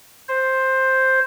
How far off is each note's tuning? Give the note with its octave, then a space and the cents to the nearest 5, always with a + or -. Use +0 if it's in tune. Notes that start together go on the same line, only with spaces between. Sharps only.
C5 +5